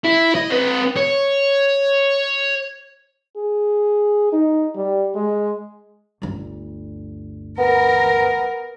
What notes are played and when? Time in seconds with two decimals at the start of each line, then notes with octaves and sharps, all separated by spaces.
0.04 E4
0.35 D#5
0.50 C4 B4
0.97 C#5
3.37 G#4
4.32 D#4
4.76 G3
5.15 G#3
6.22 G1 D2
7.58 B3 A#4